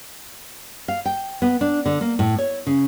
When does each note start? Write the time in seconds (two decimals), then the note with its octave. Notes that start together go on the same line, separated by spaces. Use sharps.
0.88 F5
1.06 G5
1.42 B3
1.61 D4
1.86 D3
2.01 A#3
2.19 A2
2.38 C#5
2.67 C#3